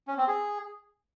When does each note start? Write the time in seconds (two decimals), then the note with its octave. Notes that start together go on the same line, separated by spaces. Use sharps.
0.08 C#4
0.18 C4
0.28 G#4